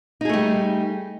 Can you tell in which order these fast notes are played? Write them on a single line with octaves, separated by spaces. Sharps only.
D#4 G#4 A3 G3